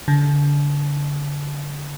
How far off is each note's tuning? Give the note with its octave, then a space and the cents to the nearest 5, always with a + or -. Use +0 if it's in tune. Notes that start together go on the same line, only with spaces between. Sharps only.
D3 -30